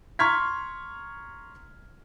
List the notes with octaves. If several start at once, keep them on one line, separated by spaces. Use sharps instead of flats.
A#5 C6 C#6 F6 G#6 B6